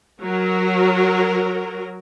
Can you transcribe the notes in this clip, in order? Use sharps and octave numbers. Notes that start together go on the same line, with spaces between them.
F#3 A#4